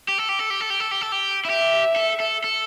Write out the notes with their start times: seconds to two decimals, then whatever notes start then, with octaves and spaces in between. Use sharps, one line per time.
0.08 G4
0.18 A4
0.29 G4
0.39 A4
0.50 G4
0.61 A4
0.70 G4
0.80 A4
0.91 G4
1.01 A4
1.12 G4
1.45 E4
1.49 G4 E5
1.96 A4
2.20 A4
2.44 A4